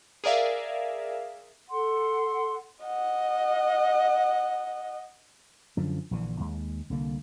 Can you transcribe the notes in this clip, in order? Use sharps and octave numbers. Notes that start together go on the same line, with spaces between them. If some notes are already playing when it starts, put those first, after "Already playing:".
G#4 A#4 D5 E5 F5
A4 F#5 C6
D#5 F#5
F#2 D3 F3
A#1 D3 E3
D#2 G#3
C2 D3 A#3